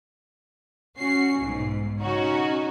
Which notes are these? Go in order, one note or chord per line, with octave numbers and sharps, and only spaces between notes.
C#4 F#4 C7
B1 G#2
C#3 C#4 D#4 F#4